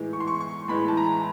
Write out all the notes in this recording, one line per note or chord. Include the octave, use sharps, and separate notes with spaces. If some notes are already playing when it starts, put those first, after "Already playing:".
Already playing: A2 E3 G#3
C#6
C6
C#6
C#6
A2 E3 G#3 B5
A5
A#5